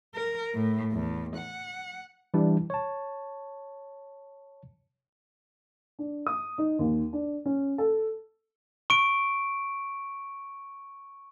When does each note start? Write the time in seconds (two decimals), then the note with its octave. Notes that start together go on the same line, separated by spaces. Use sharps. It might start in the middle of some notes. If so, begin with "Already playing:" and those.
0.14 A#4
0.54 A2
0.93 E2
1.36 F#5
2.34 E3 G3 D4 E4
2.70 C#5 A5
5.99 D4
6.27 D#6
6.58 D#4
6.79 D#2
7.13 D4
7.46 C#4
7.78 A4
8.90 C#6 D7